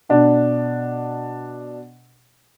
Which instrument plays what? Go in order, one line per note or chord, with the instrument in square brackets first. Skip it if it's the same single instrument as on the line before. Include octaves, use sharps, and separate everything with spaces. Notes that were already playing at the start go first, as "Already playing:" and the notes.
[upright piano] B2 D4